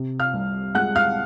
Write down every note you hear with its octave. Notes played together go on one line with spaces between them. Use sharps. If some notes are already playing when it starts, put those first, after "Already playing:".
Already playing: C3
F5 F6
C2
G#3 F#5 F#6
F5 F6